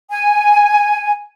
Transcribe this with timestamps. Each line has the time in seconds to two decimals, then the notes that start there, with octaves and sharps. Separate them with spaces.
0.10 G#5